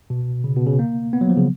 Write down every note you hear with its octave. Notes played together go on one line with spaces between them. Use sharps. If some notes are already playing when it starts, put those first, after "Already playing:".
B2
C#3
B2
C#3
A#3
B3
F#3
F3
C#3